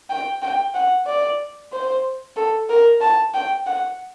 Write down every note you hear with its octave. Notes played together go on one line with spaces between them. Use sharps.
G5
G5
F#5
D5
C5
A4
A#4
A5
G5
F#5